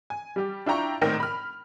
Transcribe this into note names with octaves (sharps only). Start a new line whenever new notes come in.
G#5
G3 G4
D4 E4 F4 G5 A#5 C#6
A#1 A2 D#3 C4 A#4 G5
B5 F6